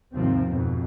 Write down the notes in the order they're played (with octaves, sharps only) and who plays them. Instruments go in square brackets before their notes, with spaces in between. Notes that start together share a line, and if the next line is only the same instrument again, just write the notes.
[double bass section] D#2 G#2 C3 F3 C4
F2 G#2 B2